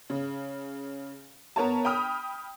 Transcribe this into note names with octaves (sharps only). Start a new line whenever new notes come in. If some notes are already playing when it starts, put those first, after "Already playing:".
C#3
B3 A#4 C#5 A5
G5 B5 D#6 F6